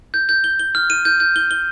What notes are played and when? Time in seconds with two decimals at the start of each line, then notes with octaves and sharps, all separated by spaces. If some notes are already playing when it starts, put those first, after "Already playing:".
0.14 G6
0.29 G6
0.44 G7
0.59 G7
0.75 F6
0.90 D#7
1.05 G6
1.20 G6
1.36 G7
1.51 G7